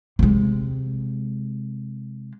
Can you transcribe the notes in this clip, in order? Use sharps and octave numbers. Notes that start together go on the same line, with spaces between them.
C3 G#3